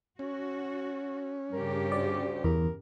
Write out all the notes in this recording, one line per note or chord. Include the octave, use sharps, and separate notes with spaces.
C#4 F#4
G2 C#3 G4 A#4
D2 D5
E2 A#4